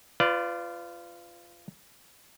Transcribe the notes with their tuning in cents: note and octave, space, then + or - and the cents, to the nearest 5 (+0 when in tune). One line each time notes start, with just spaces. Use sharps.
F4 -15 B4 +30 D5 +0